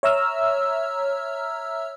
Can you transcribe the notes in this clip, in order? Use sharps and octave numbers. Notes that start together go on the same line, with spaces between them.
C#5 E5 A#5 E6 F6